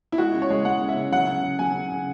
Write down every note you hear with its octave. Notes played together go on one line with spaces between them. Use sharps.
E4
G#3 F#4
C#3
C#5
G#3
G#3 F#5
C#3
E5
C#3
F#3 F#5
C#3
C#3
F#3 G#5
C#3
C#3